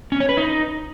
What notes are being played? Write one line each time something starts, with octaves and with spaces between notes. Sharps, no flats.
C#4
C#5
B4
D#4